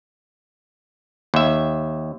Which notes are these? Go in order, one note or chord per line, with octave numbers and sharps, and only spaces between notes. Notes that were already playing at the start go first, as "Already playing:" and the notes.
D#2 E5